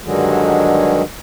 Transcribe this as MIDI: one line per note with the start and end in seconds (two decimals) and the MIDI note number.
0.03 1.02 43
0.03 1.02 50
0.03 1.02 51
0.03 1.02 54
0.03 1.02 56